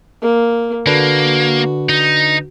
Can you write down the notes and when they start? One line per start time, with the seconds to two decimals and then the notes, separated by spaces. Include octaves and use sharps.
0.22 A#3
0.87 D3 A#3 D4 F#4 B4
1.89 D#4